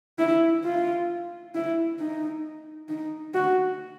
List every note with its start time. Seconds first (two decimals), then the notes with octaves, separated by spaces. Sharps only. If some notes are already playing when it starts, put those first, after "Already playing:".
0.19 E4
0.64 F4
1.55 E4
1.99 D#4
2.89 D#4
3.34 F#4